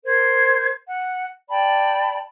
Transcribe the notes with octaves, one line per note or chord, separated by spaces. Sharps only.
A#4 C5 G#6
F#5
D5 G5 A5 B5